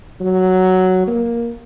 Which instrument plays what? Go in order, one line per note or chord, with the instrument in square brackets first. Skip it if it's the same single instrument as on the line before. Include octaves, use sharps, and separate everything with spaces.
[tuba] F#3
A#3